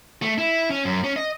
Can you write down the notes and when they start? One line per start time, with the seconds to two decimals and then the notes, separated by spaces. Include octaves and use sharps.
0.22 A3
0.38 E4
0.70 C#4
0.85 F#2
1.04 C#4
1.16 D#5